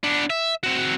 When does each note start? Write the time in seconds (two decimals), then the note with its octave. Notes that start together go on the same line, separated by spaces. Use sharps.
0.03 B3 D4
0.30 E5
0.63 C4 F#4